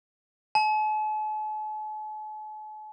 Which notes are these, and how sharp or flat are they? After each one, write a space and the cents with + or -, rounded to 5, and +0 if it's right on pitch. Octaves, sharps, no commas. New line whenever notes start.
A5 -45